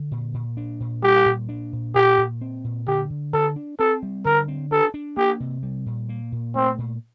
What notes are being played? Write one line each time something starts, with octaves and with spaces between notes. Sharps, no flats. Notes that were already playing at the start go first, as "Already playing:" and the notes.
Already playing: D3
A#2
A#2
D4
A#2
G3 G4
A#2
D4
A#2
A#2 G4
A#2
C4
A#2
D3 G4
D3
D3 A4
D4
C4 A4
G3
D3 A#4
C4
D4 A4
D4
A#3 G4
C3
G3
A#2
A#3
A#2
A3 C4
A#2